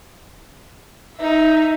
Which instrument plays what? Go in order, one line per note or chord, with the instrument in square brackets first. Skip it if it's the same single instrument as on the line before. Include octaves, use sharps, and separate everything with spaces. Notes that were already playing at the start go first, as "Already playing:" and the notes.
[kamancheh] D#4 E5